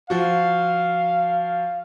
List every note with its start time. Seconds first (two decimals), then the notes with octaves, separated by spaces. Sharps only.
0.10 F3 F#4 F5